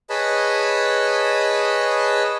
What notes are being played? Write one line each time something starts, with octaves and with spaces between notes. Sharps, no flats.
G#4 B4 C#5 D#5 A5 B5